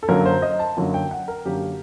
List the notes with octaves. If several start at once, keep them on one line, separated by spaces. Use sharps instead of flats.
A4
F#2 D3 F#3 A#3 A#4
C5
D#5
A5
F#2 D3 F#3 A#3
G5
F#5
A#4
F#2 D3 F#3 A#3 G4